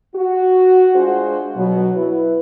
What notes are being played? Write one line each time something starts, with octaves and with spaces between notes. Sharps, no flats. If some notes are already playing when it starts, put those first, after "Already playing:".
F#4
G#3 D4 F4 F#4 G#4 C5
B2 F#3
E4 B4